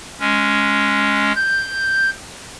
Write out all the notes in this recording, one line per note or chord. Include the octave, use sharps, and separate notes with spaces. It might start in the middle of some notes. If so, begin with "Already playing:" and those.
G#3 C#4
G6